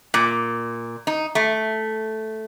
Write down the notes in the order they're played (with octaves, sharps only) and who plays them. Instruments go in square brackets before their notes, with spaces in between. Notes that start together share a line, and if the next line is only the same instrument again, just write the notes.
[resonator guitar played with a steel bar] A#2
D#4
A3